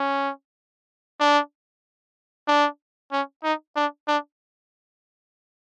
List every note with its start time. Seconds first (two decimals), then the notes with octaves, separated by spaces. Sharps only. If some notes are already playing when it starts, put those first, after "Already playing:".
Already playing: C#4
1.20 D4
2.48 D4
3.12 C#4
3.44 D#4
3.76 D4
4.07 D4